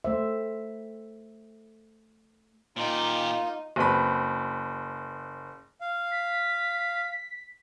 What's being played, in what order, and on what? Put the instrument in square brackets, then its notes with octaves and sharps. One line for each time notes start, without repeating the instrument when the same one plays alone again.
[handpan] A3 C5 E5
[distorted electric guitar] A#2 G4 [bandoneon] A#3 F4 [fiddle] D#4
[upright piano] F#1 C4 B4 B5
[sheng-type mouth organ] F5
[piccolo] B6